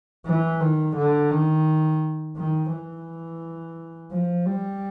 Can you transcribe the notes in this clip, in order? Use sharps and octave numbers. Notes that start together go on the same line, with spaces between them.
E3
D#3
D3
D#3
D#3
E3
F3
G3